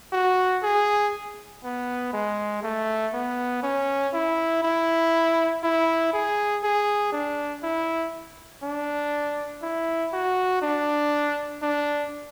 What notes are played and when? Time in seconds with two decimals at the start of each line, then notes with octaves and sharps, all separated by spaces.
0.13 F#4
0.63 G#4
1.64 B3
2.13 G#3
2.63 A3
3.13 B3
3.63 C#4
4.13 E4
4.63 E4
5.63 E4
6.13 G#4
6.63 G#4
7.12 D4
7.63 E4
8.63 D4
9.62 E4
10.13 F#4
10.62 D4
11.62 D4